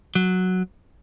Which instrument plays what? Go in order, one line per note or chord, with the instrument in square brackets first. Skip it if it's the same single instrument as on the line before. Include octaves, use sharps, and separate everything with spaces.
[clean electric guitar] F#3